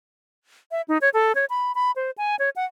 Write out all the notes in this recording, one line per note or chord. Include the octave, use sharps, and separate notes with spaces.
E5
D#4
C#5
A4
C#5
B5
B5
C5
G#5
C#5
F#5